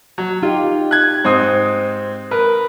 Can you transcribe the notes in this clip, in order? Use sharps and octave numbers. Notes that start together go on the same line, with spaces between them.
F#3
D#4 F4 G4
F#6 G#6
G#2 C4 D#6
A#4 B4